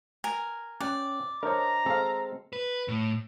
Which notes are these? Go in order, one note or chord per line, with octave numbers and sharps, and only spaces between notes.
A#4 G#5
C#4 D5 G5 F#6
D4 A#4 C5 C#5 D#5 A#5
G#3 C4 A4 F5
B4
A2